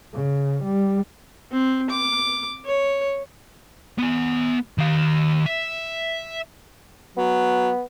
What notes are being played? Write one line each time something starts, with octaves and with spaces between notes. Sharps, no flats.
C#3
G3
C4
D6
C#5
B3 G#5
D#3 F5
E5
F#3 B3